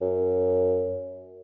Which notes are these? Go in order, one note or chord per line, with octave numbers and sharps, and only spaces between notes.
F#2